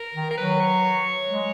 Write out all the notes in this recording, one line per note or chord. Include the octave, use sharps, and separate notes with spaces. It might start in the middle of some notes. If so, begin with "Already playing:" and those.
Already playing: A#4
D#3
A#4
F#3 B4
C#5
G#3